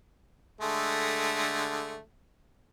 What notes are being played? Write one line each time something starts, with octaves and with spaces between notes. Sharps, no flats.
D3 G#3 A3